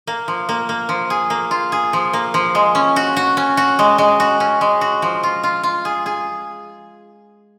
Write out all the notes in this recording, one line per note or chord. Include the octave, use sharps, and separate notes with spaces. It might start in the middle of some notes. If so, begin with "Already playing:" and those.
A#3
F3
A#3
A#3
F3
G#4
A#3
F4
G#4
F3
A#3
F3
G#3
C#4
F#4
F#4
C#4
F#4
G#3
G#3
F#4
C#4
G#3
F#4
F3
F4
F4
F4
G#4
G#4